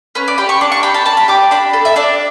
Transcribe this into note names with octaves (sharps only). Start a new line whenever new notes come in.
C#4 B4
D5
G4 B5
C#6
D4 D6
C#6
G4 B5
A5
D4 A5
B5
G4 D6
D4 B5
A4
E5
D4 D5